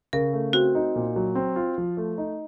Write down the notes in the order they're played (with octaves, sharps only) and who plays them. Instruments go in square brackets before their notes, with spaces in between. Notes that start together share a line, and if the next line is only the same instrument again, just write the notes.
[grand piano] C#3 [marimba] A#4
[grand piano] A3
[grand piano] C4 [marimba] F#4
[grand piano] D#4
A#2
F#3
C4
F4
F3
A3
D#4